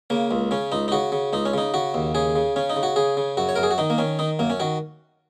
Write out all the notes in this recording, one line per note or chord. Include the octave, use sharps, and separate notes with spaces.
C#3 A#3
C#2
C#3 C#4
C#2 D#4
D#4
C#3 F#4
C#3
C#2 D#4
C#4
C#3 D#4
C#3 F#4
D#2
C#3 G#4
C#3
C#3 C#4
D#4
C#3
F#4
C#3 G#4
C#3
F#2 F#4
C#5
F#2 A#4
G#4
F#4
D#3 D#4
A#3
D#3 C#4
D#3 D#4
F#2 A#3
C#4
D#3 F#4